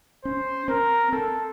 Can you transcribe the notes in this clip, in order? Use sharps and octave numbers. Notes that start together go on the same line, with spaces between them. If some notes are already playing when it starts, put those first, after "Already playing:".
C#4 C5
C4 A#4
C4 A4